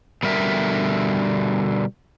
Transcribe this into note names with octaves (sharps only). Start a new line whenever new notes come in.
B2 D3 G3 A#4 E5